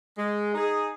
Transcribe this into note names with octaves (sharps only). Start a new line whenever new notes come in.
G#3
D#4 G#4